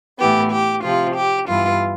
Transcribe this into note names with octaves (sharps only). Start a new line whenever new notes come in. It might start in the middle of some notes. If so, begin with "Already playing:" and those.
A2 E3 B3 G4
G4
C3 F3 C4 F4
G4
G2 E3 B3 F4